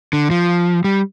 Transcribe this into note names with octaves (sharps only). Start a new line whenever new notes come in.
D3
F3
G3